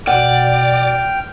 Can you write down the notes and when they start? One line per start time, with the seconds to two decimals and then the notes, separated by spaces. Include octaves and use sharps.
0.07 B2 D5 F#5 G5 F6